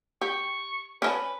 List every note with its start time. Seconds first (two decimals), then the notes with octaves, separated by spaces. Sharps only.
0.21 G4 C#6
1.02 C#4 B4 D#5 A5